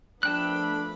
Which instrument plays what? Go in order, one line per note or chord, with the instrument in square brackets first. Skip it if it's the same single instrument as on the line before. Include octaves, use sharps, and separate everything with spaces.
[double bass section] F3 A3 B3 [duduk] D4 [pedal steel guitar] A4 G5 F#6 [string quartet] B5